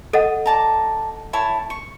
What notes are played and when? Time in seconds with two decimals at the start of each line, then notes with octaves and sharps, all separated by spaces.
0.13 A4 D#5 F#5 D#6
0.46 D5 A5 A#5
1.33 E4 C#5 A5
1.70 C#6